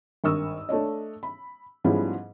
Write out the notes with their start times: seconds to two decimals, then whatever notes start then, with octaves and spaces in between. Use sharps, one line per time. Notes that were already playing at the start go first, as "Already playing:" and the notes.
0.24 G#1 G2 A#4 C#6 D#6 E6
0.69 A3 D4 C#5 D#5
1.23 B5
1.84 G#2 F3 G3 B3 C#4 E4